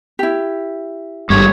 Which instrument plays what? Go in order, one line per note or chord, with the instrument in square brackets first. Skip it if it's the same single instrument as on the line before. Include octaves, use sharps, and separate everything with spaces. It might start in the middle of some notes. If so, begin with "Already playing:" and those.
[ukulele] E4 G4
[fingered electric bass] G#1 G2 [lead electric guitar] G3 A3 [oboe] C#5